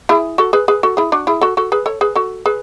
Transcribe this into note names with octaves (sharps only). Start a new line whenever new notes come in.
E4 G#4
F#4 A4
G#4 B4
G#4 B4
F#4 A4
E4 G#4
D4 F#4
E4 G#4
F#4 A4
F#4 A4
G#4 B4
A4 C#5
G#4 B4
F#4 A4
G#4 B4